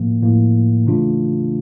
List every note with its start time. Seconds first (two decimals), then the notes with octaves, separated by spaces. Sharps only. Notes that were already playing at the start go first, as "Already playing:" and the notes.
Already playing: A2 F3 A#3
0.23 A2 F3 A#3
0.87 C#3 E3 A3 D4 F4